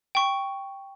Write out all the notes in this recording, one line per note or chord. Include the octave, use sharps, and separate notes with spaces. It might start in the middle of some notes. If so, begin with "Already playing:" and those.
G5 C#6